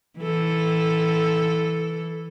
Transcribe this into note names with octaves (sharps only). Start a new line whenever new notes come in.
E3 A4